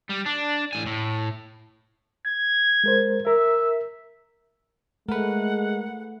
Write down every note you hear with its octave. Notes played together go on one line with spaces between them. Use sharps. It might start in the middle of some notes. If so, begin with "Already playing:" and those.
G3
D4
A2 G#5
A2
G#6
G#3 A#4 C5
A#4 E5
G#3 A3 A#4 B4 F#5